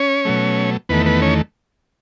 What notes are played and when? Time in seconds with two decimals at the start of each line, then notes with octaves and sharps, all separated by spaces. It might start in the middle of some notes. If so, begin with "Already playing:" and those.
Already playing: C#4 C#5
0.25 B2 F#3 A3
0.89 E2 D#3 A3 B3 B4
1.06 B3 B4
1.22 C#4 C#5